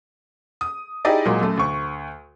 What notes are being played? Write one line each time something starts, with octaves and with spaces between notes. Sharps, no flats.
D#6
D#4 E4 G4 G#4 D5 D#5
A#2 F#3 G#3 A#3
F#2 A3
D2 C#6